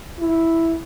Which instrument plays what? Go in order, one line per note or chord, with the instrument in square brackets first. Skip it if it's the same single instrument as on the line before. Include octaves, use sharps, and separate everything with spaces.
[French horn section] E4